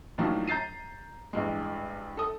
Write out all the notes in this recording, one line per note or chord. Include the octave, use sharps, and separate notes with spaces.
A#1 A2 D#3 F3 F#3
A#5 G6 A6 C7 D#7
A1 G2 G#3
A4 D#6